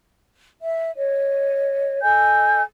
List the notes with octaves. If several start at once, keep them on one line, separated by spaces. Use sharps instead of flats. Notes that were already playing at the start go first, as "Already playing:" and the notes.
E5
C#5 D#5
A4 D#5 G#5 G6